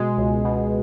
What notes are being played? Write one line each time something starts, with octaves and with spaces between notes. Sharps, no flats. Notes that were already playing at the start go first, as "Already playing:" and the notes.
Already playing: B2 G#3
C#2
B2